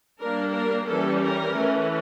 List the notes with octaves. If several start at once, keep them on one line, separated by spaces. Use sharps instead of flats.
G3 A#3 D4 A#4
A#4
E3 G3 C#4 A4
A#4
E3 A3 C#4